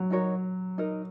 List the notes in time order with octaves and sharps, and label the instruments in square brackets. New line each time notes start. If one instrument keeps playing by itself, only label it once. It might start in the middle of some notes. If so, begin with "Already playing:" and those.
Already playing: [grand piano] F#3
[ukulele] D#4 F#4 A#4 C#5
D#4 A#4 D#5